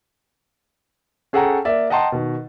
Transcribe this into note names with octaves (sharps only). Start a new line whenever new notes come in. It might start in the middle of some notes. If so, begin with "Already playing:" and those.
C#4 G#4 A4 F#5 G5 A#5
A#3 D5 E5
D#5 F#5 G5 A5 A#5 C6
B2 D#3